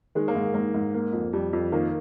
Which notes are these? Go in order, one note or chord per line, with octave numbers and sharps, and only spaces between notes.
D#3 G#3
A#3
G#2
G#2 A#3
G#2
A#3
F2
F2 G3
F2
D#3 A#3